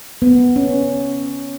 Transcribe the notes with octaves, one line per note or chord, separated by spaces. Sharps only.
B3
C#4